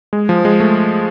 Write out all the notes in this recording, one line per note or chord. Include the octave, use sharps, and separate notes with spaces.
G#3
F3
G#3
A3